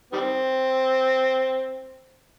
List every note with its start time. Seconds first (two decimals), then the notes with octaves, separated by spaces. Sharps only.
0.13 D#3 G3 C4